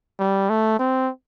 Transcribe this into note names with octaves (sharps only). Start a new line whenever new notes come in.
G3
A3
C4